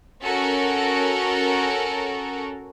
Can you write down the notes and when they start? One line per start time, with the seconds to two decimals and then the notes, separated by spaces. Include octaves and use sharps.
0.22 C#4 F#4 A4 A#4